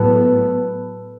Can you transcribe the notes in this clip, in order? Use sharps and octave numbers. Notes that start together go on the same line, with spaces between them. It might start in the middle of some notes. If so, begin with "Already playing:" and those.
Already playing: A2 F#3 B3 A4 B4